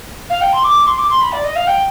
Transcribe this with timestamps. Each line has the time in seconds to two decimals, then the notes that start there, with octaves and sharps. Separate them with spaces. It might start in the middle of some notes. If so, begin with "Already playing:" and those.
0.29 F5
0.41 G5
0.52 C6
0.63 D6
0.86 C6
0.97 D6
1.09 C6
1.21 B5
1.32 D5
1.44 D#5
1.55 F5
1.66 G5